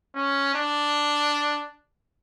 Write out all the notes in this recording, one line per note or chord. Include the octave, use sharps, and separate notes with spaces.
C#4
D4